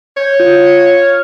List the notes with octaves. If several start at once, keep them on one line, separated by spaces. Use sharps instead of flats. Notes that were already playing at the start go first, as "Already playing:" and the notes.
C#5 G6
F4
F6